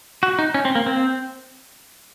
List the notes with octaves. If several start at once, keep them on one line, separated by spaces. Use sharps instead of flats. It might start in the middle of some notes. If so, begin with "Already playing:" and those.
F#4
D#4
C#4
C4
A#3
C4